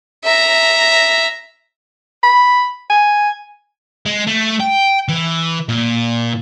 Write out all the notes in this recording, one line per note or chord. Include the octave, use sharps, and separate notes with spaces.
E5 A#5
B5
G#5
G#3
A3
G5
E3
A#2